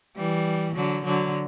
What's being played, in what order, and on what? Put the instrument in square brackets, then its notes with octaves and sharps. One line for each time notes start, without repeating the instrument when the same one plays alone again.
[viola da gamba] E3 G3
D3 F#3
D3 F#3